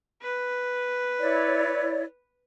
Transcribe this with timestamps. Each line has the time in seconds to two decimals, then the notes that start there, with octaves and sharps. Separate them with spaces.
0.21 B4
1.20 E4 C#5 D5